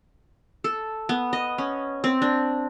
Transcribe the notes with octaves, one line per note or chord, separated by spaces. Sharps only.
A4
B3
D#5
C#4
C4
D4